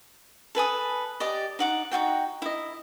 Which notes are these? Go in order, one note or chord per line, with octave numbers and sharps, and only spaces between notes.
A4 B4 G#5 D#6
G4 D5 D#5
D#4 F#5 D6
D#4 F4 F#4 G5
E4 D#5